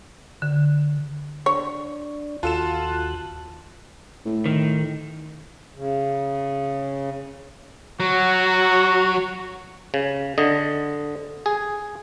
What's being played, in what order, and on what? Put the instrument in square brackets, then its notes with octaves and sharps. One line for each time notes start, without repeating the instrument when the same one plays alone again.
[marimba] D3
[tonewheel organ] D4 [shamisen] C#5
[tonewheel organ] D#2 F#4 F#6 [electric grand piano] F4 A4 E7 [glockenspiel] A5
[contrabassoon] A2
[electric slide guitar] D#3
[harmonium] C#3
[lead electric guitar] F#3 [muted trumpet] F#4
[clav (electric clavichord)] C#3
D3 D#5
G#4